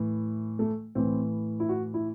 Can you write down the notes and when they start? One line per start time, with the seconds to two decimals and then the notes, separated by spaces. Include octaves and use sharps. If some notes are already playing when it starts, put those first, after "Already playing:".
Already playing: A2 E3
0.59 A3
0.95 A2 E3 C4
1.60 E4
1.69 F#4
1.94 E4